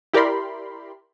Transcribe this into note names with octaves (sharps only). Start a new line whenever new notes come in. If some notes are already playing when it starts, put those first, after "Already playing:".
E4 G4 A#4 D5 B5 C6